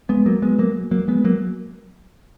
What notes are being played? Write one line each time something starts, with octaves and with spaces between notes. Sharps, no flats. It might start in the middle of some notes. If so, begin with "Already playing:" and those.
G#3 B3
F#3 A#3
G#3 B3
F#3 A#3
F#3 A#3
G#3 B3
F#3 A#3